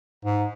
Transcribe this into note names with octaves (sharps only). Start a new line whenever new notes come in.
G#2